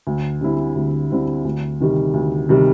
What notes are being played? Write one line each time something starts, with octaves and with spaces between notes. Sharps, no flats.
D2
D3 G3 C4 E4
D2
D3 G3 C4 E4
D2
C3 D#3 G3
D2
C3 D#3 G3